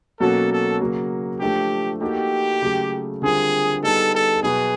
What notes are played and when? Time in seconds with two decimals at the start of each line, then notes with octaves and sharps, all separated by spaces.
0.20 B2 F#3 A#3 C#4 F#4 A4
0.51 A4
0.81 C#3 F#3 A#3
1.40 F3 A3 D4 G4
2.01 A#3 D#4 F#4 G4 A4
2.62 C#3 F#3 A3
3.22 D3 G3 C4 F4 G#4 A#4
3.82 G3 B3 D#4 G#4 A4
4.13 A4
4.43 B2 F#3 B3 G#4